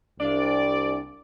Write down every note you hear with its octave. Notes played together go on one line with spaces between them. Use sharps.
C2 D4 D5 F5